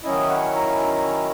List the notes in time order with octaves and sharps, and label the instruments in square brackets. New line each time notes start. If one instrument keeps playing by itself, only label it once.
[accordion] D#3 F#3 C#4 E4 D#5
F#5
A#5